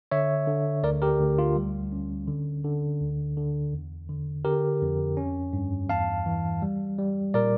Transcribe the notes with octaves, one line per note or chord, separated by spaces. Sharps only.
D3 C#5 E5
D3
D2 A#4 D5
G4 A#4
D2
F4
G3
C#4
D3
D3
D2
D3
E2
D3
D3 G4 A#4
F2
C#4
G2
E2 F5 A5
E3
G3
G3
A#2 A#4 D5